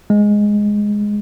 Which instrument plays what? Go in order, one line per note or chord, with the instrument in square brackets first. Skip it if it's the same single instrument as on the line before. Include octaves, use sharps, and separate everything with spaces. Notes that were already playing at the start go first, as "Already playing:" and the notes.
[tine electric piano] G#3